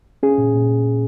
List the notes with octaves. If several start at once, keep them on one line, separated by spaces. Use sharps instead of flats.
C#4 G#4
A#2
A#2